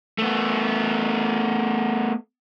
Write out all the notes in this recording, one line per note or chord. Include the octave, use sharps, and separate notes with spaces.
A3 B3